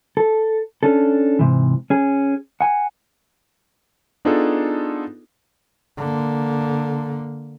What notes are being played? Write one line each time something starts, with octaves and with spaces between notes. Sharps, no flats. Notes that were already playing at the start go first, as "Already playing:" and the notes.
A4
C#4 D4 A4
G#2 C3 E3
C#4 G#4
F#5 G#5
B3 D4 D#4 F4 G#4 A4
D3 A#3